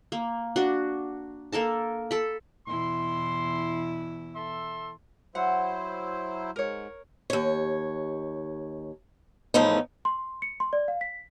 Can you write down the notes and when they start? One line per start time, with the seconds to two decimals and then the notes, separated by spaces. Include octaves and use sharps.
0.12 A#3
0.56 D4 F#4
1.52 A#3 A4 A#4 A5
2.11 A4 B5
2.67 E2 B2 E4 C6
4.35 A4 E5 C6
5.35 F#3 E4 C5 F#5
6.56 G#2 A#4 C#5
7.30 D#2 C#5
9.54 E2 A2 F3 A3 B3 D#4
10.05 C6
10.42 C#7
10.60 C6
10.73 D5
10.88 F5
11.01 B6